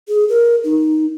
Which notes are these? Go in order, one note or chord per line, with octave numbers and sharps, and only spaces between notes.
G#4
A#4
D#4